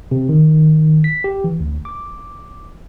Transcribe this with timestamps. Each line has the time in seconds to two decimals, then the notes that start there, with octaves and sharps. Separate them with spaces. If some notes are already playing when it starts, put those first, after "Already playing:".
0.11 C3
0.29 D#3
1.04 B6
1.24 G4
1.44 E3
1.60 D2
1.85 D6